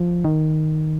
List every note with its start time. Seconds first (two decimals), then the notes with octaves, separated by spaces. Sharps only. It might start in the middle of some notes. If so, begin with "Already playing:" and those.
Already playing: F3
0.24 D#3